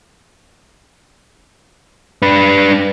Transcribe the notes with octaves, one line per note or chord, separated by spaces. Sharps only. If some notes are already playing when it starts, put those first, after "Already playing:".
D4 B4